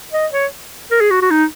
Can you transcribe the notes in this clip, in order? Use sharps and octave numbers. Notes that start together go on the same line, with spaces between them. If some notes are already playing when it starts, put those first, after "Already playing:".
D#5
C#5
A#4
G#4
F#4
F#4
D#4